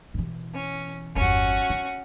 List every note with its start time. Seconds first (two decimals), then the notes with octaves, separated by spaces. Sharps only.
0.14 B2 E3
0.54 C#4
1.16 G1 E2 C#4 F#4
1.69 C#3